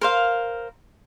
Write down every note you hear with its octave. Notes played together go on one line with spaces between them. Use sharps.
A#4 C5 F5